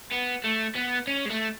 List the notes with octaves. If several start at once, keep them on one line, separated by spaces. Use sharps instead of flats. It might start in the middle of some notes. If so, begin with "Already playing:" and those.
B3
A3
B3
C#4
G#3
A3